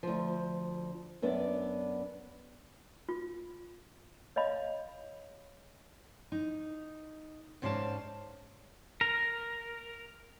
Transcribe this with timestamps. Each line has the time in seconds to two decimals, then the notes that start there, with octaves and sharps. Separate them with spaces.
0.03 D2 F3
1.22 F#2 B3 D4 D5
3.09 F4
4.36 C#5 D#5 F5 B5
6.32 D#4
7.62 G#2 C#4 C5 D5 F5 A5
9.01 A#4